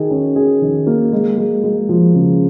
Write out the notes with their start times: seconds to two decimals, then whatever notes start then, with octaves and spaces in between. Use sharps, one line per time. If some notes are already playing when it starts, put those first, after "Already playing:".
Already playing: D#3 G#4
0.10 C#4
0.36 G#4
0.61 D#3
0.87 A#3
1.13 G#3
1.38 G#3
1.64 G#3
1.89 F3
2.14 C#3